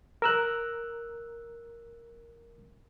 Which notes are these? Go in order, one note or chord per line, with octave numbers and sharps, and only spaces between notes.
A#4 E6 F#6